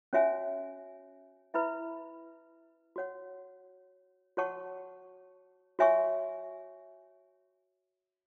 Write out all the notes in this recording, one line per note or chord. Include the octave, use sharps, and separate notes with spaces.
C#4 F#4 C#5 E5 G#5
E4 B4 E5 B5
F#4 C#5 F#5
F#4 C#5 F#5 A5 C#6
F#4 C#5 E5 G#5 C#6